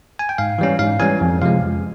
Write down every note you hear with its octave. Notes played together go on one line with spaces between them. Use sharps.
G#5
G5
G#2 F5
E3 G3 C#4
G#2 F5
E3 G3 C#4 G#5
F2
C3 F3 G#3 F5
F2